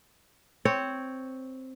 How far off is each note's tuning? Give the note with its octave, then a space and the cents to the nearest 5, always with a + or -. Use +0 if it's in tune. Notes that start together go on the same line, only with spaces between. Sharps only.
C4 +0 C#5 +0